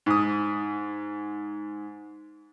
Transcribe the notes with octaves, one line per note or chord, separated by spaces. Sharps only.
G#2 D#6